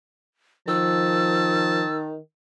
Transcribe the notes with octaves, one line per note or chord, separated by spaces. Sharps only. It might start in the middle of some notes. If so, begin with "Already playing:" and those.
D#3 F3 A5 E6